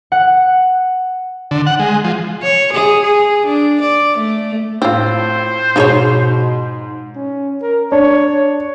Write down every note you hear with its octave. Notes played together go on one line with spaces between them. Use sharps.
F#5
D3
F#5
G#3
F3
C#5
G#4
G#4
D4
D5
A3
A2 C4 F4 C5
G#2 B2 F3 G#4 C#5
C#4
A#4
D4 C#5